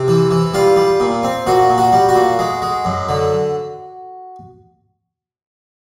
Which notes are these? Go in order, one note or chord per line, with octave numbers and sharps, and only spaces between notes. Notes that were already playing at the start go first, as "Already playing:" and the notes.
Already playing: C3
E3
E3
G3 F4
G3
A#2
C4
A#2 F#4
A#2
F#4
G3
F#4
A#2
G#3
G#3
F#2
D3